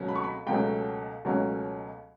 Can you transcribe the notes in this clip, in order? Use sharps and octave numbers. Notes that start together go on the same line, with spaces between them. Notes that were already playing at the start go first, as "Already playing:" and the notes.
Already playing: C#2 B2 F#3 A3 C#4
B5
C#6
B5
C#2 B2 F#3 A3 C#4 G5
C#2 B2 F#3 A3 C#4